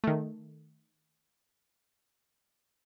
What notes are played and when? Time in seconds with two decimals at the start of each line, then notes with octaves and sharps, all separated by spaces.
0.04 D#3 A3